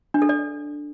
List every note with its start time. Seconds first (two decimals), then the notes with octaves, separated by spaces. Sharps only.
0.14 D4
0.22 A4
0.29 D5